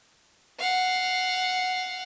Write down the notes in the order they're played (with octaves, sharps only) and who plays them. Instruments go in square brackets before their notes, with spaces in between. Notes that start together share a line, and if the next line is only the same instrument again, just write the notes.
[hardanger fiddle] F5 F#5